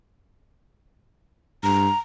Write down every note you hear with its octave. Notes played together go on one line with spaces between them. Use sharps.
G2 A#5